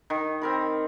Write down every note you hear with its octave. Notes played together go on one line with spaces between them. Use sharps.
D#3
C4 A#4 B5